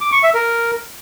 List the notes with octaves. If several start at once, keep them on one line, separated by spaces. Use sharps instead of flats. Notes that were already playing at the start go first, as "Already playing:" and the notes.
D6
C#6
E5
A#4